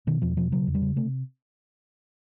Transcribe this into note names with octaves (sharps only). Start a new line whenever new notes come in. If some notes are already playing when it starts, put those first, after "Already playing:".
B2 D#3
E2 F3
B2 F3
C#3 F#3
E2
G3
C#3
C3 A3